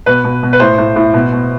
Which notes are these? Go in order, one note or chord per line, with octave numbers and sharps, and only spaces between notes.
B2 B4
B2
B2
B4
A2 C5
A2
A2
B2
B2